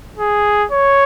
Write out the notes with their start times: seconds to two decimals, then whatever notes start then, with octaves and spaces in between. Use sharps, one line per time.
0.18 G#4
0.71 C#5